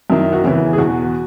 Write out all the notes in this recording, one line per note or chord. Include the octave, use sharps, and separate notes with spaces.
F#2 D#3 E4
F#4
E2 C#3 E3 E4
G#4
E2 B2 F#4